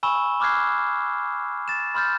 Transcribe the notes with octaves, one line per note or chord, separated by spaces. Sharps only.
G#5 B5 C#6 E6 E7 G7
B5 D6 F6 F#6 G#6 C7
A6 E7
B5 C6 F6 G6 A6